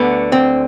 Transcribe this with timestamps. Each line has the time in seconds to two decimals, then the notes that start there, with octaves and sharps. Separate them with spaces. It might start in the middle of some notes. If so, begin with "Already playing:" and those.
Already playing: D2 D3 B3
0.32 C4